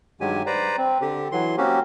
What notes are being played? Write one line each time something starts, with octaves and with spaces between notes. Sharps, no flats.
G2 D#3 F#3 G#3 G4 G#5
B4 C5 D5 A#5
C4
D3 G4
E3 F#3 C6
A#3 C4 C#4 F#4 G4